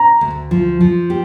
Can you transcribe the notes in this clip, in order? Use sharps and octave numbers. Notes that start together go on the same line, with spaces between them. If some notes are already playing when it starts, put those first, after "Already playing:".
Already playing: A#5
D2
F3
F3
G4